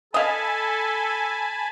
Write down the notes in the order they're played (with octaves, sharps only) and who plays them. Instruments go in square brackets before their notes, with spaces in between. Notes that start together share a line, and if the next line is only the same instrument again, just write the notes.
[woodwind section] A4 [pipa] D#5 F5 [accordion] G#5 A5 B5